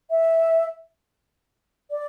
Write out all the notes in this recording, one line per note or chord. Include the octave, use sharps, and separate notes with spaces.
E5
D5